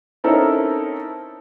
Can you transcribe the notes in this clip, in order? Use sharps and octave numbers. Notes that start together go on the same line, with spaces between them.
C4 C#4 D#4 E4 A4 A#4